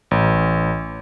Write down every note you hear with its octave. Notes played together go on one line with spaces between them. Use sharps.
A1